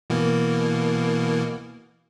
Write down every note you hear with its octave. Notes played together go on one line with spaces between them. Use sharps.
B2 E3 A#3